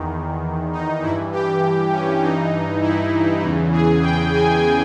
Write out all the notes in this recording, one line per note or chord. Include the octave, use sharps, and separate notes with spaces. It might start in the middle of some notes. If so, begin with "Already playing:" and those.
Already playing: E2 D#3
D#4
G2 E3 E4
G4
C#4
G2 E3 D#4
E4
E2 C#3 E3
G#4
G5
G#5